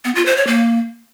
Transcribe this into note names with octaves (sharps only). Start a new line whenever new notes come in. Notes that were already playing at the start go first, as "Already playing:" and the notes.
B3
F4
C5
C#5
A#3